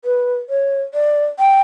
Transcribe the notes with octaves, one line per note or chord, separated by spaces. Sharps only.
B4
C#5
D5
G5